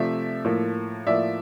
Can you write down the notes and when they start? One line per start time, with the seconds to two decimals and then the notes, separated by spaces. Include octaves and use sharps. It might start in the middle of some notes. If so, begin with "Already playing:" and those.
Already playing: C3 F3 A3 D5 E5
0.45 A2 F3 A#3
1.07 A2 F3 A#3 D5 E5